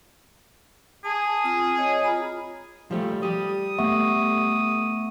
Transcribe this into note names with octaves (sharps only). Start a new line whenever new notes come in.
G#4 A5
C4 F4 D#6
C#5 D#5 G#5
F4 A#5 B5
F3 G3 A3
G3 G4 D#6
A3 B3 E5 F#5 C#6